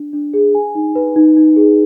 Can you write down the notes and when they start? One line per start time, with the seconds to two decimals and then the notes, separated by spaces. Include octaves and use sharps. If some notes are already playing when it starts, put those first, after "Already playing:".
Already playing: D4
0.13 D4
0.34 G#4
0.55 G#5
0.75 D#4
0.95 B4
1.16 D#4
1.37 D#4
1.56 G#4